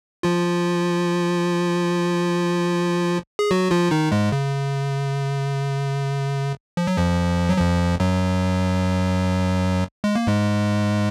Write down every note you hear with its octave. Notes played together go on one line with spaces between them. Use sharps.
F3 F4
G#4
F#3 F#4
F3 F4
D#3 D#4
G#2 G#3
C#3
F3
F#3
F2 F3
F#3
F2 F3
F#2 F#3
G#3
A#3
G#2 G#3